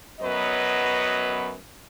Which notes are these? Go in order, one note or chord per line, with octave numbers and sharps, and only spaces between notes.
F#2 F#3 B3 B4 D#5